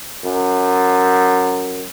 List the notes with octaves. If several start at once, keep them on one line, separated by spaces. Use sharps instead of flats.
F#2